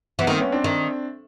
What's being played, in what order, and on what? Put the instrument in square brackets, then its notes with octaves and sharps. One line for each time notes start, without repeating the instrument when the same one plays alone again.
[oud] E3 [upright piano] B3
[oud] D#3 [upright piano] A#3 C4
[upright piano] B3 C#4
C4 D4
[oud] D#3